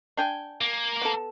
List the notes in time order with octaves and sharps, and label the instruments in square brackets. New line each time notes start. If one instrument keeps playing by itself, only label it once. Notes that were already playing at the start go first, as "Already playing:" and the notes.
[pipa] D4 G5 G#5
[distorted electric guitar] A#3
[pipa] B3 A4